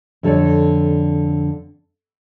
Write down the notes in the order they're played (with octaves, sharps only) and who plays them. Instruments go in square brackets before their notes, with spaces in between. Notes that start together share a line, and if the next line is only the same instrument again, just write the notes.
[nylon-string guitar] F2 D3 A4 C#5 D5